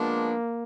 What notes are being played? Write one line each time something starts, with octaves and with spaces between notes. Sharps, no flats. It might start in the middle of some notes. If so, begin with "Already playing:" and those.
Already playing: F3 G#3 A#3 B3 D4